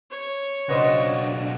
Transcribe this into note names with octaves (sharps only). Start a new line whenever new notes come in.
C#5
B1 C#3 D4 F#4 B4 C5 D#5 F5